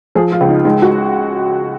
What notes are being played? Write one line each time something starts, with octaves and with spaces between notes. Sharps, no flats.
F3 G#4
F4
C#2
D#4
G#3 D#4
F#4